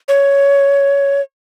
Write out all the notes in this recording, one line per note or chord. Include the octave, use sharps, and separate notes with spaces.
C#5